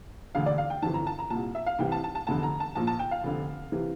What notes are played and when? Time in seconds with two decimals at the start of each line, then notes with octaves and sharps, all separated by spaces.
0.35 E1 D2 D3 F5
0.46 D5
0.58 F5
0.70 G5
0.82 G1 F2 E3 A5
0.94 A#5
1.07 A5
1.19 A#5
1.30 C2 A#2 A5
1.55 E5
1.66 F5
1.79 C2 C3 E3 G5
1.92 A5
2.04 A5
2.15 A5
2.27 F1 E2 D3 A5
2.43 A#5
2.60 A5
2.75 A#1 A#2 A5
2.87 A5
2.99 G5
3.11 F5
3.24 F1 F2 D3
3.72 C3 E3